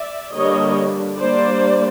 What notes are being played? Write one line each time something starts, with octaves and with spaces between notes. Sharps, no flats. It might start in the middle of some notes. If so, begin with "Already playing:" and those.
Already playing: D5 E5
D3 G3 A#3 D4 C#5 D#5
G3 A#3 D4 C5 D5